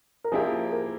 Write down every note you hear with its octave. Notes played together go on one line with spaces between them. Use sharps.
A#4
F3 A#3 E4 G4 G#4
A#4